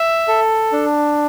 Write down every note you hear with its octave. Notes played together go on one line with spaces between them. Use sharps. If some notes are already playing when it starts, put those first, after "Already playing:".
Already playing: E5
A4
D4